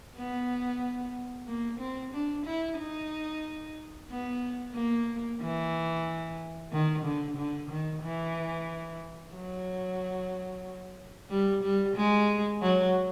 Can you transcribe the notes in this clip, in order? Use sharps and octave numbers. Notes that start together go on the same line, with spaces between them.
B3
A#3
C4
D4
E4
D#4
B3
A#3
E3
D#3
D3
D3
D#3
E3
F#3
G3
G3
G#3
F#3